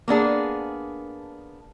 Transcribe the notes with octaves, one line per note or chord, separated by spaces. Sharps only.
A#3 B3 D4 G#4